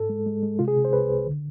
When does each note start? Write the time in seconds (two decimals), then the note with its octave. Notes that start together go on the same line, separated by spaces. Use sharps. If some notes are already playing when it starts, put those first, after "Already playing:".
Already playing: G#2 A4
0.09 G#3
0.26 G#3
0.43 G#3
0.59 C3 F4
0.68 G#4
0.76 C3
0.85 C5
0.92 C2 B4
1.09 C2
1.26 D3